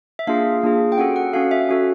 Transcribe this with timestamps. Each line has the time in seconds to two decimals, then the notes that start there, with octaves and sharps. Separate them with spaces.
0.19 E5
0.27 A#3 D4 F4 G#4 F5
0.63 A#3 D4 F4 G#4
0.92 G5
0.98 C#4 F#4 A4 F#5
1.16 F#5
1.33 C#4 F#4 A4 F5
1.51 E5
1.69 C#4 F#4 A4